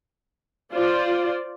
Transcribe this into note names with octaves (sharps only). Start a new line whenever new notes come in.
F4 C5 D5